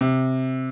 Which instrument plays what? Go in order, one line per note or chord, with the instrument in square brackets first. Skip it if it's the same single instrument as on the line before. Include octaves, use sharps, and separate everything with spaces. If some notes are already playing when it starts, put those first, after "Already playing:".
[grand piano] C3